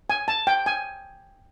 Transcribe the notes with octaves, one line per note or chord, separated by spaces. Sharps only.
G#5
A5
G5
G#5